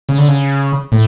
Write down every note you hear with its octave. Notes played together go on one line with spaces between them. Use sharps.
C#3
D3
C#3
A2